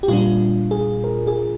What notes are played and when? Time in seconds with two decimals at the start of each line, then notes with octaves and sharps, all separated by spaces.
0.03 G4
0.08 A#2 G3 D4 F4
0.71 G#4
1.04 A#4
1.27 G#4